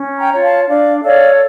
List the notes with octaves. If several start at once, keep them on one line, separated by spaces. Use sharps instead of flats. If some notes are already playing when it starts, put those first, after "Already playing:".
Already playing: C#4
G5 A#5
F4 C#5
F5 A5
D4 D5 F5
A4 C#5 D5 F5